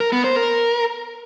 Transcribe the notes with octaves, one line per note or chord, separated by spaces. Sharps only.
A#4
B3
C5
A#4